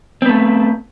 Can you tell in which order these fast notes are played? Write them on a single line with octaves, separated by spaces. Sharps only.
C4 B3 A3